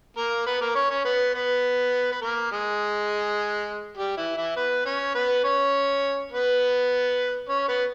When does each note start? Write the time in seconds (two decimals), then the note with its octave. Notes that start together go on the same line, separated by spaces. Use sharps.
0.17 A#3 A#4
0.46 B3 B4
0.61 A#3 A#4
0.75 C#4 C#5
0.90 C#4 C#5
1.05 B3 B4
1.34 B3 B4
2.12 B4
2.22 A#3 A#4
2.51 G#3 G#4
3.97 G3 G4
4.17 E3 E4
4.36 E3 E4
4.56 B3 B4
4.85 C#4 C#5
5.14 B3 B4
5.44 C#4 C#5
6.32 B3 B4
7.49 C#4 C#5
7.68 B3 B4